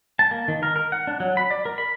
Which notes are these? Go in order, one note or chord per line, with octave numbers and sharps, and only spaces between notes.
A5
A#3
D#3
A#4
A#4
F#5
D4
F#3
B5
D5
A#4
B5